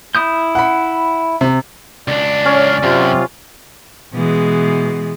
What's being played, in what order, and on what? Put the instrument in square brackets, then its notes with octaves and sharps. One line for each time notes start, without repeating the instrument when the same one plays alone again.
[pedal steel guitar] E4 D#6 G6
[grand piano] F#5 B5
C3
[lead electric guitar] C#2 D4 [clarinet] D5
[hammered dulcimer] C#4
[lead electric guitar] F#2 [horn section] C3 F4
[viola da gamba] B2 E3 G#3